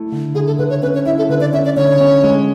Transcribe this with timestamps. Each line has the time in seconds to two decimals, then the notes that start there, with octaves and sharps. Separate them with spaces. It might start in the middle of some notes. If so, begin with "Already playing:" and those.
Already playing: A3 E4
0.12 D3
0.35 D3 G#4
0.47 A4
0.59 D3 B4
0.70 C#5
0.82 C#4 B4
0.94 C#5
1.06 E4 E5
1.18 A4
1.29 D3 B4
1.41 D5
1.53 C#4 E5
1.65 D5
1.76 D3 C#5
2.00 C#4
2.23 G#3